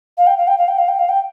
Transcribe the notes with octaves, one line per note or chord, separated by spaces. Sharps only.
F5
G5
F5
G5
F5
G5
F5
G5
F5
G5